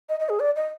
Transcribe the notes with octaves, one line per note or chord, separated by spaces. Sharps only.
D#5
D#5
G#4
D5
D#5